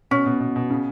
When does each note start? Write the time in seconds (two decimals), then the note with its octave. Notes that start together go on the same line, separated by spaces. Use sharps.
0.11 B2 C#4
0.26 B2
0.40 B2
0.56 B2
0.70 C#3